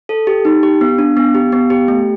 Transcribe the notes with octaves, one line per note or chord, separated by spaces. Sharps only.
A4
G4
D#4
G4
B3
D4
B3
G4
B3
G4
A3